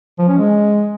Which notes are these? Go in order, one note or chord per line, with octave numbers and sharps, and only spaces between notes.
F3
C#4
G#3